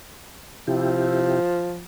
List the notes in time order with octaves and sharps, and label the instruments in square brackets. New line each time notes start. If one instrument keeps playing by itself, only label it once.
[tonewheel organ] C3 E4 G4 [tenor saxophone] F3